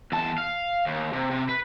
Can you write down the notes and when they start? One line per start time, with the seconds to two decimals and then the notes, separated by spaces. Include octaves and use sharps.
0.12 E2 A5
0.38 F5
0.86 D#2
1.13 C3
1.31 C3
1.49 B4